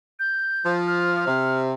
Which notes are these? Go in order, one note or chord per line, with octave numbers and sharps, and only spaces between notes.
G6
F3
F6
C3